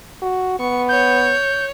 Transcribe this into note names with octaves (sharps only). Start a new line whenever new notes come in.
F#4
B3 C#6
C#5 G6